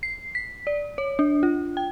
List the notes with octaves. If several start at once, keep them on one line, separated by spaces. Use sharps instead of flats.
C7
B6
D5
C#5
D4
F4
G5